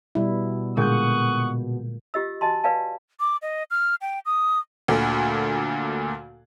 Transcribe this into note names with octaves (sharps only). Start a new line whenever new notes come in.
B2 G3 E4
A#2 D3 G#3 F#5 C#6 D#6 G6
F4 G4 D#5 E6
F#4 D#5 G#5 A5 C6
B4 D5 F5 G#5 A5
D6
D#5
F6
G5
D#6
D2 A#2 D3